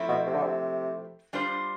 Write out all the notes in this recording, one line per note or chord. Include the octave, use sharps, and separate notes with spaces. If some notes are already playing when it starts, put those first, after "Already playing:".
Already playing: F3 A3 C4 E4
B2
C3
D3
C3
G3 D4 F4 C5